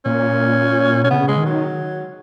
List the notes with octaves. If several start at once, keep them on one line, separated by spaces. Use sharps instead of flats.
A#2 C#4
B2 C#4
C#3 B3
G#3
D#3
F#3